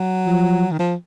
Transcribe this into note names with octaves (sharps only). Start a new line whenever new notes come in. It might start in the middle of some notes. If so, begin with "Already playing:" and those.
Already playing: F#3
F3
D#3
F3